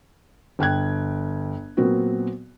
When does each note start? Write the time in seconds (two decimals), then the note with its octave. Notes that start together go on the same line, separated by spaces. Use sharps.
0.59 G1 G5 F#6 G#6
1.77 A#2 F#3 B3 C4 F#4 A#4